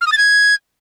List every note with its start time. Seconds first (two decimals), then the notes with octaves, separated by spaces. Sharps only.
0.01 F6
0.07 D#6
0.12 A6
0.18 G#6